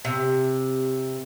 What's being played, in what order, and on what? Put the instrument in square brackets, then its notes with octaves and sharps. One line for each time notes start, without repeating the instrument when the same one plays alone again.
[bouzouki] C3